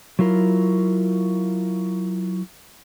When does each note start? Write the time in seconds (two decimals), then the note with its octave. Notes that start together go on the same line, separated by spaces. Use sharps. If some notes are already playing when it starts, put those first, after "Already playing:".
0.19 F#3 E4 F4 A#4